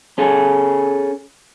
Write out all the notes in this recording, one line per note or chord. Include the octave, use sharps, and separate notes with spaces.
C#4 G#4 A4